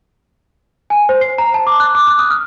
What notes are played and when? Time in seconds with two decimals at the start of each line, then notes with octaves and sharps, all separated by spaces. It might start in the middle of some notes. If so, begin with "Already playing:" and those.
0.90 G#5
1.09 C5
1.21 C7
1.38 A#5
1.54 A5
1.67 D6
1.80 F#6
1.95 D6
2.07 F#6
2.19 D#6
2.31 F6